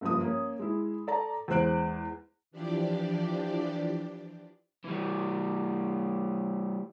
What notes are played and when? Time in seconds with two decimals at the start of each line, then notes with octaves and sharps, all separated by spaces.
0.01 F#1 G2 F3 D#6
0.20 A#3 C#4
0.59 G#3 E4
1.07 A4 D5 A5 A#5
1.48 E2 G#3 C5 F#6 D7
2.51 E3 F3 D4 G4 D5
4.84 E3 G3